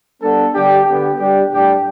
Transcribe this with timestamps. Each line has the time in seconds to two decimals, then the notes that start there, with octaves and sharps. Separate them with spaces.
0.21 G3 B3 D4 A4
0.53 D3 G3 D4 G4
0.85 D3 B3 G4
1.17 G3 D4 G4
1.49 A2 G3 D4 G4